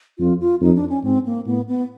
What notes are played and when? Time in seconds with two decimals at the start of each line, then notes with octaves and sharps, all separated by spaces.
0.19 F2 F4
0.40 F4
0.61 F2 D#4
0.75 D4
0.89 C#4
1.04 G#2 C4
1.26 A#3
1.46 A2 B3
1.68 B3